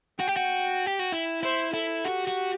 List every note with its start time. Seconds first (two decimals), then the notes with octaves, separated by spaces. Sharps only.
0.20 F#4 G5
0.28 G4
0.36 F#4
0.86 G4
0.99 F#4
1.12 E4
1.43 E4 C5
1.74 E4 A4
2.04 F#4 G4
2.27 F#4